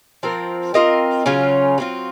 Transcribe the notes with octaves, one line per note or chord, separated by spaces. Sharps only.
F3 C4 F4 A#4
C4 F4 A#4 D#5
C#3 F#3 C#4 F4
F#3 C4 F4